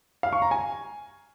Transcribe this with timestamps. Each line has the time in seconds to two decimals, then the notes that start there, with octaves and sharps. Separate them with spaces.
0.23 F5
0.33 C#6
0.42 A#5
0.51 G#5